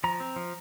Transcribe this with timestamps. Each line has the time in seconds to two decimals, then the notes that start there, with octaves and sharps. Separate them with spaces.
0.04 F3 A#5
0.20 C4
0.36 F3